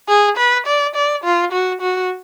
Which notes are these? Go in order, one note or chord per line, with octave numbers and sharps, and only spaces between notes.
G#4
B4
D5
D5
F4
F#4
F#4